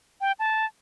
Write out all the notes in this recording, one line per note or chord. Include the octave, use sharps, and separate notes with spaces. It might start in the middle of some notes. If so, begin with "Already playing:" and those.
G5
A5